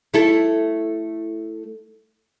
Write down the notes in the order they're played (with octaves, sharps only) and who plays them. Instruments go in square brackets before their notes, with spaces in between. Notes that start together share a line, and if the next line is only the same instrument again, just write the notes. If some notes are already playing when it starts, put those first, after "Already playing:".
[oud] A3 E4 A4